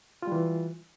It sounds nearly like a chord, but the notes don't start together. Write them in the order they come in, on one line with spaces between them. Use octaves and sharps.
F4 G3 E3